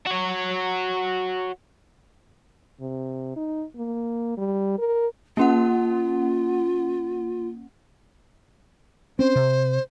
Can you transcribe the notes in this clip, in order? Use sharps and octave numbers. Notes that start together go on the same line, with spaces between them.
F#4 C#5
C3
D#4
A#3
G3
A#4
A#3 C#4 F4 F#5
C4 C#4 C5
C3